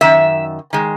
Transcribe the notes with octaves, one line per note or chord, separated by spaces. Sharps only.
F#2 D#3 E5
D#3 G#3